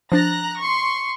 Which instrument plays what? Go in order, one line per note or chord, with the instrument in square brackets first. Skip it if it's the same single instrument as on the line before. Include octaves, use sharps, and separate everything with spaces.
[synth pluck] F3 D4 A6 [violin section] A#5 F#6 A#6
[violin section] C6 C#6